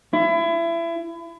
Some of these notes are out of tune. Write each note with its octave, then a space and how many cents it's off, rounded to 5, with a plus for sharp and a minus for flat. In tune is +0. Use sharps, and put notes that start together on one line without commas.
E4 +30